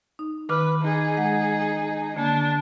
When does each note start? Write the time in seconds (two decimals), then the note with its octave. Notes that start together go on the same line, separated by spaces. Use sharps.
0.19 D#4
0.49 D#3 B4 D6 F6
0.81 D#4 G#4
1.17 G#3 F#5
1.62 G#5
2.16 D3 A#3 D4